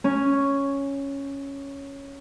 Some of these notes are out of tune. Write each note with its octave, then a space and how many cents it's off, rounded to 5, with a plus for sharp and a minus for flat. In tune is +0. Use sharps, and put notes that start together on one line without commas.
C#4 +0 G#5 +0